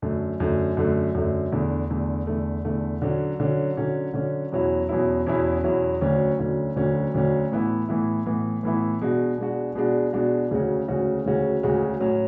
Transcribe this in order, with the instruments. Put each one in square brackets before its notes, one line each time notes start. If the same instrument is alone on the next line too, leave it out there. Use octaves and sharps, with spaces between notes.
[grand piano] F#2 D3 A3
F#2 D3 A3
F#2 D3 A3
F#2 D3 A3
E2 D3 A3
E2 D3 A3
E2 D3 A3
E2 D3 A3
D3 F#3 C#4
D3 F#3 C#4
D3 F#3 C#4
D3 F#3 C#4
E2 B2 F#3 C#4 E4
E2 B2 F#3 C#4 E4
E2 B2 F#3 C#4 E4
E2 B2 F#3 C#4 E4
D2 D3 F#3 C#4
D2 D3 F#3 C#4
D2 D3 F#3 C#4
D2 D3 F#3 C#4
A2 E3 B3 E4
A2 E3 B3 E4
A2 E3 B3 E4
A2 E3 B3 E4
B2 G#3 D4 F#4
B2 G#3 D4 F#4
B2 G#3 D4 F#4
B2 G#3 D4 F#4
D2 C#3 G#3 C#4 F#4
D2 C#3 G#3 C#4 F#4
D2 C#3 G#3 C#4 F#4
D2 C#3 G#3 C#4 F#4
A2 F#3 C#4